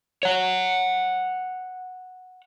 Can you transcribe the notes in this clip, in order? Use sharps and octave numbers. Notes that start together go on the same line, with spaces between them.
C#5 F#5